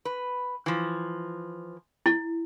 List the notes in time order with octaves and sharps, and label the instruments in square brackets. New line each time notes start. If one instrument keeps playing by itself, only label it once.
[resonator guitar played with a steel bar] B4
E3 F3
[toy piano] E4